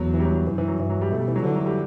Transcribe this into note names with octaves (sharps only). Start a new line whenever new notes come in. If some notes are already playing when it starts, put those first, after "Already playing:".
Already playing: E2 F#3
E3
G3
F#3
F#3
F#2 E3
E3
F#3
G2 E3
F#3
G3
B2 A3
G3
E3
F#3
D3 E3
F#3
G3